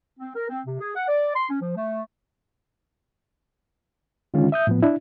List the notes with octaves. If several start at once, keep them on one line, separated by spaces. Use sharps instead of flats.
C4
A#4
C4
C3
G#4
F#5
D5
C6
C#4
F3
A3
D3 D#3 G#3 C#4 F4
E5 D#6 G6
A2 F3 B3
D4 E4